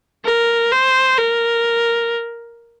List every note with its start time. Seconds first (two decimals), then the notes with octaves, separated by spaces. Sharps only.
0.24 A#4
0.72 C5
1.18 A#4